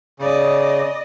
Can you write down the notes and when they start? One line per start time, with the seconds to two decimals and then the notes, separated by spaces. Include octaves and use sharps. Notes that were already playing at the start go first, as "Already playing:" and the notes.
0.20 C#3 D5 D#5